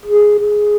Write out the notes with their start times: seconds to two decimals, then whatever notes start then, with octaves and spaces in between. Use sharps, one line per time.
0.06 G#4
0.39 G#4